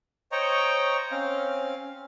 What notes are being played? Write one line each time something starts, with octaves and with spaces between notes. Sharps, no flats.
C5 C#5 D#5 G5 A#5 C#6
C4 C#4 F5